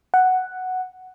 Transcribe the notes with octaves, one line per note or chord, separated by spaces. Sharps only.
F#5